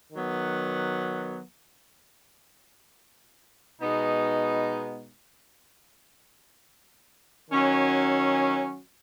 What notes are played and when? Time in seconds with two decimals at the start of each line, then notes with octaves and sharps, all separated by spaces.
0.12 D#3 F#3 B3
3.81 B2 G#3 B3 D#4
7.50 D#3 F#3 C#4 F#4